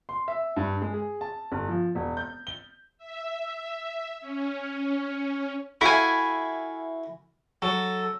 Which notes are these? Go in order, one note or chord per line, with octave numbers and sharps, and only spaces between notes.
C6
E5
G2
G#3
G#4
A5
G1
F3
E1
G6
G7
E5
C#4
E4 F#4 A4 F5 G#5
F#3 A4